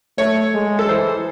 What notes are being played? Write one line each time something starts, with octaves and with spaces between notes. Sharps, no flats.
A3 C#5
G#3
A4
E3 C5